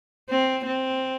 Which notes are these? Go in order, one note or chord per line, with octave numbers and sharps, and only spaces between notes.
C4
C4